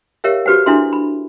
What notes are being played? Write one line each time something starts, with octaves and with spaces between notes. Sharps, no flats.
G4 A#4 C#5 E5 F5
F#4 G4 B4 C5 F#5
D4 E4 F#4 A4 E5 C6
B5